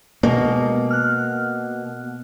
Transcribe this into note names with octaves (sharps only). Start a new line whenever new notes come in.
B2 G#3 A#3 A#4
F6 F#6